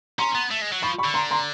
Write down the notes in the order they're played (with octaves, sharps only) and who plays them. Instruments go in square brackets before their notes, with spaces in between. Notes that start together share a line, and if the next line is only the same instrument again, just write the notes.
[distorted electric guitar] C#4 [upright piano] A#5 C6
[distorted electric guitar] B3
A3
G#3
F#3
[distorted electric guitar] F3 [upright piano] B5 C#6
[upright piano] B5 C#6
[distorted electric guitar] D3
[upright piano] A#5 C6
A#5 C6